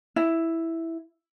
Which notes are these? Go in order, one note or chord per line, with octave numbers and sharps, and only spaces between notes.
E4